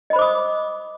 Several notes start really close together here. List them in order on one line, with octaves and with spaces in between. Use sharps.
D#5 B5 C5 D6 D#6